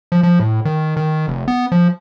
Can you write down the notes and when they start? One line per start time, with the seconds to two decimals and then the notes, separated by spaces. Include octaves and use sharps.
0.12 F3
0.23 F3
0.40 A2
0.65 D#3
0.97 D#3
1.28 F1
1.48 B3
1.72 F3